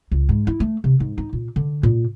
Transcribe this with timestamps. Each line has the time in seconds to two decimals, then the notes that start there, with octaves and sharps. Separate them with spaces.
0.11 C#2
0.29 G#2
0.47 E4
0.60 A3
0.84 C3
1.00 G#2
1.18 D#4
1.33 A#2
1.56 D3
1.83 A#2